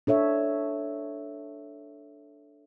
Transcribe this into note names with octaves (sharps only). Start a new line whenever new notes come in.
D4 A4 C#5 E5